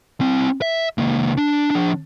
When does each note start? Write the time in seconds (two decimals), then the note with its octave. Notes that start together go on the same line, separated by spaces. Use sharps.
0.21 C4 E4
0.62 E5
0.98 C#2 A#3
1.37 D4
1.70 F3 D4